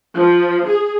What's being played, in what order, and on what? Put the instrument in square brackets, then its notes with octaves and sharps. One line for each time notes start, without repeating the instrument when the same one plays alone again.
[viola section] F3
G#4